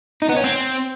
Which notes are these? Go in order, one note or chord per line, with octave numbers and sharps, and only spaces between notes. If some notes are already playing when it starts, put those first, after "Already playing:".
D#4
B3
C#4
C4